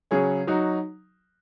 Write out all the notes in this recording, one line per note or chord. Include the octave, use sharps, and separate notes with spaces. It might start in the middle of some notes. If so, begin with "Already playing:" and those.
C#3 F#3 C#4 G#4
F#3 D#4 F#4